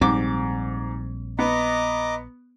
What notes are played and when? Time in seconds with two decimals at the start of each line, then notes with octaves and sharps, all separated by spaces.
0.01 A#1 G#2 G3 C4 D6
1.39 B3 D#5 A#5 D6